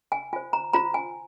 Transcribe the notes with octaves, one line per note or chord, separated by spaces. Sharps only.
G#5
F4 C5 G#5
A#5
F4 C5 A#5
G#5